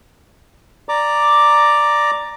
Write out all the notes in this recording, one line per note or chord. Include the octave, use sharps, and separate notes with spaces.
D5 A#5 D6